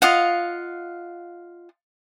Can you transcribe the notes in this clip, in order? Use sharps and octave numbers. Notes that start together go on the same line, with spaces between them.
F4 D#5 F5 F#5